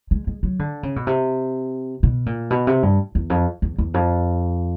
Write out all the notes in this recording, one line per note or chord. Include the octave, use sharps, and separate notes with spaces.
G#3
G#3
F#3
D3
C#3
B2
C3
B2
A#2
B2
C3
G2
E2
F2
E2
E2
F2